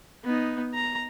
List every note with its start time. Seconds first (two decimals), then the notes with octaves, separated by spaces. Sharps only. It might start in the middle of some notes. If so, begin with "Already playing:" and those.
0.24 B3 D#4
0.74 A#5